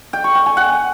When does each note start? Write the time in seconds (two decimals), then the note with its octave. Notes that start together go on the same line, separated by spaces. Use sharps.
0.13 G5
0.24 C#6
0.35 G5
0.46 G#5
0.57 F#5